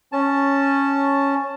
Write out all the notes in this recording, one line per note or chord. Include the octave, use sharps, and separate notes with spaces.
C#4 A5